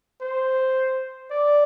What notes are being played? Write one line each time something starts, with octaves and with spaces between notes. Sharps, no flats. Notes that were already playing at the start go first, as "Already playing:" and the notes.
C5
D5